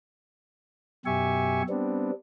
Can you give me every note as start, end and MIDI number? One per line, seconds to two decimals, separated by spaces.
1.06 1.62 42
1.06 1.62 47
1.06 1.62 67
1.06 1.62 76
1.06 1.62 80
1.06 1.62 85
1.69 2.11 55
1.69 2.11 59
1.69 2.11 60
1.69 2.11 62